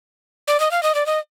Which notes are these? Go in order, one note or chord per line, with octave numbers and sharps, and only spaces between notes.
D5
D#5
F5
D#5
D5
D#5